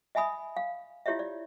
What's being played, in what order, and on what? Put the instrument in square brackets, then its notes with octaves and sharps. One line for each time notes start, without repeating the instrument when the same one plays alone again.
[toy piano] D#5 E5 G#5 B5 D#6
F5
E4 F4 G4 C#5 D#5 E5
D5